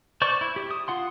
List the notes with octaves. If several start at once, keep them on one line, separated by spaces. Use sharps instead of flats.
C5 D5 C#6 D6
E4
G4
D#6
F4 F#5 C6